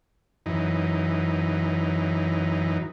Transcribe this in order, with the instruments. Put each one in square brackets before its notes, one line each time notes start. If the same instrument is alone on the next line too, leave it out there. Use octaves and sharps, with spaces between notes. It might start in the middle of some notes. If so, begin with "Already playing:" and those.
[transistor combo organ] F#2 E3 D#4